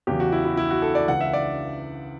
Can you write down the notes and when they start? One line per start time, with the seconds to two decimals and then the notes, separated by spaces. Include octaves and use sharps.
0.07 E2 C#3 F#3 G4
0.20 F#4
0.32 E4
0.45 E4
0.57 E4
0.71 F#4
0.82 A4
0.95 D5
1.08 C#2 C#3 E3 F#5
1.21 E5
1.33 D5